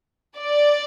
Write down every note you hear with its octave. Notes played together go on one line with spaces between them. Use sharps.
D5